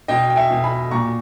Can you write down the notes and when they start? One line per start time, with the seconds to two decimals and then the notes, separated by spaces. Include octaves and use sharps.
0.08 B2 D#5 G5
0.30 G5
0.36 E5 G#5
0.51 B2
0.64 G#5 B5
0.91 A#2 A#5 C#6